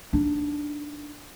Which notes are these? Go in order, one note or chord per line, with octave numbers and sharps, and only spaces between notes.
D4 D#4